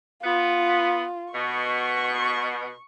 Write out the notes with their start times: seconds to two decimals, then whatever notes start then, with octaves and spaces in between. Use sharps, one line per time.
0.24 B3 F4
1.34 B2 C#6